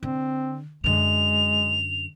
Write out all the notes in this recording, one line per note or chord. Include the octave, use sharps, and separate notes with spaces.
D3 C4
F#2 D3 G#3 F7